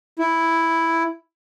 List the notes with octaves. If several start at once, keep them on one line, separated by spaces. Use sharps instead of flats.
E4